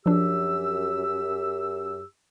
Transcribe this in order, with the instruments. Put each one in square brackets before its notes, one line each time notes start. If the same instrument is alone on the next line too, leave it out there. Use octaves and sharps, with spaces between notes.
[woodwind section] F#2 G4 E6 [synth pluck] F3 D4